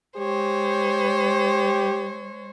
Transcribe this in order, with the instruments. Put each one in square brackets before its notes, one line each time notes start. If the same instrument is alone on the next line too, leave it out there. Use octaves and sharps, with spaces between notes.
[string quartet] G#3 C5 C#5 [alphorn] G4